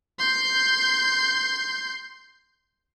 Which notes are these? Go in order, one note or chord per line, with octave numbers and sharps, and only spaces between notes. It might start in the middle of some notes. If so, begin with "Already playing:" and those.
C6 G6